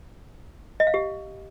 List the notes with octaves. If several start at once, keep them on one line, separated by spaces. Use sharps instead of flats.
D#5
F5
G4